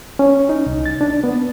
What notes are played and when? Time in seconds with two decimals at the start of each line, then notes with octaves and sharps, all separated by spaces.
0.19 C#4
0.49 D#4
0.66 C2
0.86 A6
1.01 D4
1.24 B3